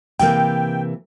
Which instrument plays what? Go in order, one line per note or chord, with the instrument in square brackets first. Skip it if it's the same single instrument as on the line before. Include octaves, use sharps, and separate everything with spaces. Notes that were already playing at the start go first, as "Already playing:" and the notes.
[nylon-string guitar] C3 E3 A#3 [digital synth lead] G5